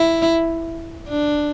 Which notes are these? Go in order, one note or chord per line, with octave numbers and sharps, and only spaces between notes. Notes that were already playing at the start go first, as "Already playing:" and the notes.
Already playing: E4
D4